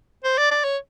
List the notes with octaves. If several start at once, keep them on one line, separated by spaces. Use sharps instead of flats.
C5
D5
D5
C#5